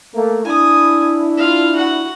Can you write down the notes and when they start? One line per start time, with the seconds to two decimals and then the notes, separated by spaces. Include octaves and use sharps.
0.15 A3 A#3
0.45 D4 E4 G#5 D#6
1.37 F4 F5
1.76 F#4 F#5